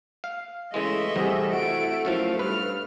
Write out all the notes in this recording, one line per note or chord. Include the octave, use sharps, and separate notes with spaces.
F5
C#3 E3 G#3 A3 D#5 E5
E2 C3 G3 G#4
E4 F#4 D7
F#2 A2 F3 F4 F5
G2 B4 F6